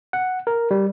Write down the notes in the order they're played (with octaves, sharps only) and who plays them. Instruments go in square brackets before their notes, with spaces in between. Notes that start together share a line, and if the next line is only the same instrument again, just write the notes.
[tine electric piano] F#5
A#4
G3